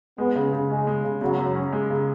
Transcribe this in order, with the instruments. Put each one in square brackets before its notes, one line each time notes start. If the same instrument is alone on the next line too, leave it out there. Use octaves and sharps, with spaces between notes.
[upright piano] G#3 [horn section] B3
[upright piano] C#3
C#3
[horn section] G#3 [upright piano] C#4
[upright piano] G#3
C#3
[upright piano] C#3 [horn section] F#3
[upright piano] F#2
C#4
G#3
C#3